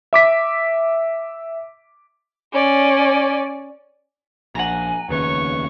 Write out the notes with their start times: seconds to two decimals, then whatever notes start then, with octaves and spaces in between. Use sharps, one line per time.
0.13 E5 D6 B6
2.52 C#4 D5
4.55 A#1 F#5 G#5 A#5
5.09 F1 D#2 C#3 B4 C#5 C#6